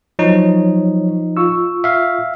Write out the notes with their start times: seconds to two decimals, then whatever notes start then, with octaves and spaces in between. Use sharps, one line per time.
0.19 F3 F#3 D#4 C#5
1.37 F4 C#6 E6
1.84 E5 F5